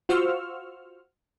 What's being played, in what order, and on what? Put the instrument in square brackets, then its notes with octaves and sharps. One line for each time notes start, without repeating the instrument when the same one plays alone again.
[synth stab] F4 F#4 C5 C#6 E6 F6